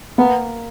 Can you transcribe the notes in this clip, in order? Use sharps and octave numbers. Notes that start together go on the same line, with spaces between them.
A#3 B3